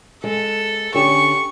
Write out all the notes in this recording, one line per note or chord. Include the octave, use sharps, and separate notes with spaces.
G#3 A4
D3 C#4 G4 C#6